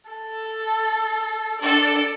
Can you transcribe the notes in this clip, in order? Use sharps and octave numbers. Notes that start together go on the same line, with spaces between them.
A4
D4 A4 D5